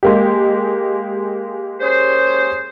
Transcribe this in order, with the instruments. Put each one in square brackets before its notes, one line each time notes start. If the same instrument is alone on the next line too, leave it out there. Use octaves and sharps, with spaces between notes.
[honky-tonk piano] G#3 A#3 G4
[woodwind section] C#4 G#4 C5